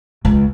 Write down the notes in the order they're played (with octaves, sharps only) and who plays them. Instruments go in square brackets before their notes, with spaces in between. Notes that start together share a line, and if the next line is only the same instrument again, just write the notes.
[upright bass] C#2